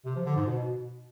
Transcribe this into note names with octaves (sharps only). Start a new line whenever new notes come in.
C3
F3
D3
G#2
B2